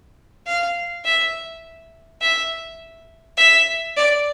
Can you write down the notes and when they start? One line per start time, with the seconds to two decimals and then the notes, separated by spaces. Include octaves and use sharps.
0.47 F5
1.05 E5
2.22 E5
3.37 E5
3.97 D5